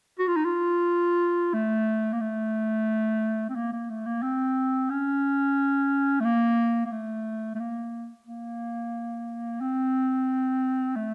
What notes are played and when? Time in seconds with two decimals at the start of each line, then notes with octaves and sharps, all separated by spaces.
0.19 F#4
0.28 F4
0.36 D#4
0.45 F4
1.54 A3
2.13 A#3
2.20 A3
3.50 C4
3.56 A#3
3.73 A#3
3.89 A3
4.06 A#3
4.23 C4
4.90 C#4
6.20 A3
6.24 A#3
6.86 A#3
6.92 A3
7.55 A3
7.60 A#3
8.27 A#3
9.61 C4
10.96 A3